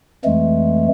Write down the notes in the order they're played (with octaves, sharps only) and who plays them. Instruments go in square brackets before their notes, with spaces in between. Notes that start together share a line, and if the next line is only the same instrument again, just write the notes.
[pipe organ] F2 E3 G#3 A3